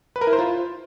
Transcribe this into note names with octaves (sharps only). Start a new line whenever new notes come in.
B4
A#4
E4
C5
F4